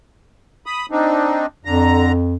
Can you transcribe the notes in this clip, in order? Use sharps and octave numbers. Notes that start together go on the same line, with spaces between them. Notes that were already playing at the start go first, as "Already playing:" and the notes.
B5 D#6
C4 D4 D#4
F2 D3 A#5